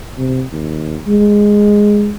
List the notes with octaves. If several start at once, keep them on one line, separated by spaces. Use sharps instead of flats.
C3
D#2
G#3